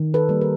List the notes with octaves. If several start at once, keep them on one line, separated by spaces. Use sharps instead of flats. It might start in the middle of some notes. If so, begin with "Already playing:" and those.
Already playing: D#3
A4 B4
G3 A#3
A#4